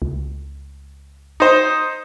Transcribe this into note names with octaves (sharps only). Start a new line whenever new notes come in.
C#2
D#4 C5